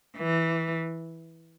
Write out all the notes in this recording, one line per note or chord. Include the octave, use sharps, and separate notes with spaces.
E3